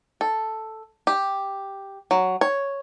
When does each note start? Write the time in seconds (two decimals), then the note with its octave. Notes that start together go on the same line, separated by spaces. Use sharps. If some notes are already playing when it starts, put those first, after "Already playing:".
0.21 A4
1.07 G4
2.11 F#3
2.41 C#5